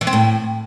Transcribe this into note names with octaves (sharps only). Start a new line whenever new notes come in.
E3
C4
A2